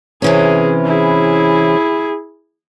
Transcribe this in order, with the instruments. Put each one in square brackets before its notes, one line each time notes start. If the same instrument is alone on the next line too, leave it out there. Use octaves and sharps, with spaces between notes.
[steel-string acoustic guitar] C3 E3 C#4 [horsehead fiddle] G#4
[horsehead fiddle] E4 G#4